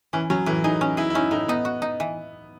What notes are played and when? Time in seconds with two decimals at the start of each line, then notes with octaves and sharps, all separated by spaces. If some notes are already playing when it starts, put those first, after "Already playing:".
0.13 E3 C#4
0.30 F#3 C#4
0.46 A2 E3
0.64 D#4 G#4
0.81 C#4
0.97 E4 G#4
1.10 E4
1.15 C#4 D#4
1.31 A2 D#4
1.48 B3 D#4
1.65 F#4
1.82 D#4
2.00 E3